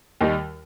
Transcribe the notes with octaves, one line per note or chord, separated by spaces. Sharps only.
D#2 D#3 G3